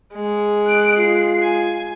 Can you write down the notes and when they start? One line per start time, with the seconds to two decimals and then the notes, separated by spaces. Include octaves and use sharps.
0.14 G#3
0.67 F#6 D7
0.98 F4 C7
1.42 G#5